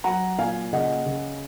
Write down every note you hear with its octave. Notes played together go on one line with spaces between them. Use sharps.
F#3 F#5 A#5
A#2 F5 G#5
C#3 D#5 F#5
C#3